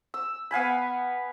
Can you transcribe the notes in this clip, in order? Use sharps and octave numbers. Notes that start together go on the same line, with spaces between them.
E6
B3 F5 G#5 B5